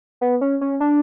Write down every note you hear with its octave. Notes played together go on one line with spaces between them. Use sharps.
B3
C#4
C#4
D4